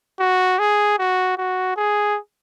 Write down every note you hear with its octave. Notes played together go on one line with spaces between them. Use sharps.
F#4
G#4
F#4
F#4
G#4